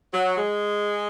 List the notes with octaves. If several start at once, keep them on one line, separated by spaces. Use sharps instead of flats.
F#3
G#3